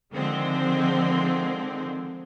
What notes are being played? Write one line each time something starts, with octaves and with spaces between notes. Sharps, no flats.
D3 D#3 F3 G#3 C4